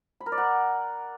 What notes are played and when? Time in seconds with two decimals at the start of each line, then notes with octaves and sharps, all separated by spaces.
0.20 B5
0.26 A#4
0.32 D5
0.38 F#5